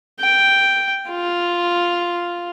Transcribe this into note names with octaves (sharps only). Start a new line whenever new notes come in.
G5
F4